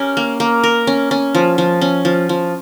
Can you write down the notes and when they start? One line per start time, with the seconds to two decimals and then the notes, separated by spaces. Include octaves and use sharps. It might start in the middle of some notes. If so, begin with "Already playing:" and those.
Already playing: C#4 G4 A#4
0.17 A#3
0.40 A#3
0.64 A#4
0.87 C#4
1.11 C#4
1.35 F3
1.58 F3
1.81 C#4
2.05 F3
2.29 F3